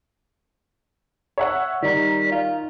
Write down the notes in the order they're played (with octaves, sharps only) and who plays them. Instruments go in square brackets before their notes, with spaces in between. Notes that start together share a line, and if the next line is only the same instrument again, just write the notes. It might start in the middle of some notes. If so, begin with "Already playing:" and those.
[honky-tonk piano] C#5 E5 F#5
[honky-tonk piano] D#3 A#5 [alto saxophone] G3
[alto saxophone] F4